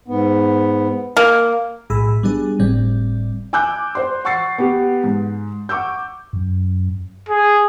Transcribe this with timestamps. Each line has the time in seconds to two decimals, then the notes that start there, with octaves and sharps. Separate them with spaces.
0.08 G#2 B3
1.17 A#3
1.90 B1 A2 G#4 B5 E6
2.23 G3 B3 D4 G#4
2.59 G1 A2 G3 C4 D5
3.53 G#5 D6 E6 F#6 G6
3.95 C5 D5 C6
4.25 F#5 C#6 E6 A6 C7
4.58 B3 G4
5.04 G#2
5.69 F#5 C#6 D6 E6 G6
6.33 F#2
7.29 G#4